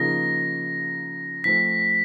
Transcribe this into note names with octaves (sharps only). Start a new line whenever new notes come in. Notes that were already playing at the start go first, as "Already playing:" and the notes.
Already playing: C#3 F3 A#3 D#4 G#4 A#6
F3 A3 C4 B6